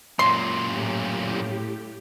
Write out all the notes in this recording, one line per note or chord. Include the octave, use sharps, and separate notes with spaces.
F#2 A#2 C6
A2 G4